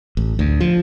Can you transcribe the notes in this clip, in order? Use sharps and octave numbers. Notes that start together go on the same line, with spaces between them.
A1
D2
F3